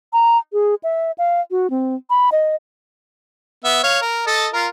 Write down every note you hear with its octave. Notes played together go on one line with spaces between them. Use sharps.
A#5
G#4
E5
F5
F#4
C4
B5
D#5
B3 E5
C#5 F5
A#4
A4 D#5 A5
F4 A#4